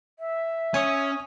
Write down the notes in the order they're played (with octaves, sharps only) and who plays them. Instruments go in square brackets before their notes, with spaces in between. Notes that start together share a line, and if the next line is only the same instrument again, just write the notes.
[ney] E5
[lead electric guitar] C#4 [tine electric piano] G#5 C#6 D#6